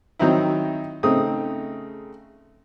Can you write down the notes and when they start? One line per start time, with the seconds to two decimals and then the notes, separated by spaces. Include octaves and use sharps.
0.19 D#3 F#3 C4 D#4 E4
1.03 C#3 A3 C4 D#4 D#6